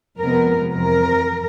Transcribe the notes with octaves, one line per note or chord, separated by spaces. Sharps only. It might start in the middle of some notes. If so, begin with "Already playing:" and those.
F2 C3 F3 G#3 B3 A#4
F2 C3 E3 A#4